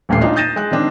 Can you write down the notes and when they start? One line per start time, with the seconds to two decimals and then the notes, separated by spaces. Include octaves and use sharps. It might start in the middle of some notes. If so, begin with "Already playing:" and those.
0.09 D#1 A1 A#2 A3 C7
0.21 D4 D#4 F4
0.36 D#6 G6 A6 A#6 D#7 E7
0.56 G#3 F#6
0.71 D#3 C4 D4